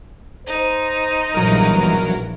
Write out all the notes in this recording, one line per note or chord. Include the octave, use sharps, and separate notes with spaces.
D#4 C5
A#1 G2 B2 E3 F#3 A#4 A#5